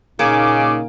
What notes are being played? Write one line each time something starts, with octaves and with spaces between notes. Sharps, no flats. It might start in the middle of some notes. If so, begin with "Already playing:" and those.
A#2 C#3 A#3 D#4 G#5 D6